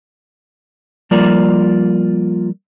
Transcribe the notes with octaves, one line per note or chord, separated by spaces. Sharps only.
F3 G3 A#3 F4 A#4 D5